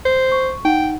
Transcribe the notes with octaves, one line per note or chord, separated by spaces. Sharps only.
C5
C#6
D#4 F#5 G5